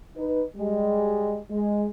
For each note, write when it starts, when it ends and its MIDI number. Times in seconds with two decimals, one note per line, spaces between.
0.16 0.43 63
0.16 0.43 71
0.55 1.39 55
0.55 1.39 56
1.49 1.85 56